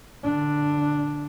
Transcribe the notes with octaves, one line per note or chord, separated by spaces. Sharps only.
D3 D4